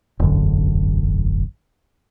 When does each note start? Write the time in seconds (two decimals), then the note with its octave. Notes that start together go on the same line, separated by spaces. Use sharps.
0.19 E1 A1 F#2 D3